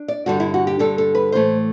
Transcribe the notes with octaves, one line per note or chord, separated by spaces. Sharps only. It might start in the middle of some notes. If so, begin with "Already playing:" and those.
Already playing: D4
D5
G2 D3 G3 D4 F#4
E4
F#4
G4
G2 D3 G3 D4 A4
A4
B4
A2 E3 A3 C5